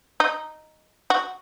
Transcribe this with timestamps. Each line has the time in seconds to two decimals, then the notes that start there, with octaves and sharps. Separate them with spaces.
0.20 D#4
1.10 F#4